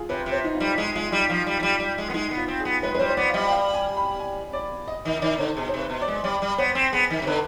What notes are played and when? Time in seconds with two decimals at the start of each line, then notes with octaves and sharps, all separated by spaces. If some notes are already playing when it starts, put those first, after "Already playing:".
Already playing: F4 G#4
0.09 C3 B4
0.26 C3
0.32 C5
0.44 D#4
0.55 F4
0.60 G3
0.78 G#3 D#4
0.95 G#3 F4
1.12 G3 D#4
1.29 F3 F4
1.47 G3
1.60 F3
1.63 G3
1.80 G3
1.98 G#3
2.10 B3
2.14 G#3 D#4
2.31 B3
2.37 F4
2.48 C4
2.60 G#4
2.65 B3
2.83 G#3 B4
2.94 G#3 B4
2.99 G3 C5
3.09 C5
3.17 B3 D5
3.29 F5
3.34 G3 D#5
3.46 G5
3.51 F5
3.74 G#5
3.97 B5
4.19 G#5
4.53 D5
4.88 D#5
5.05 D#3 D#5
5.17 D#5
5.22 D#3 D5
5.38 D3 C5
5.56 B2 G#4
5.69 C5
5.74 C3
5.79 B4
5.90 B2
6.02 D5
6.08 G#3
6.24 G3 D5
6.42 G3
6.58 B3 C5
6.75 C4
6.92 B3 G#4
7.10 D#3
7.22 C3
7.27 D3 B4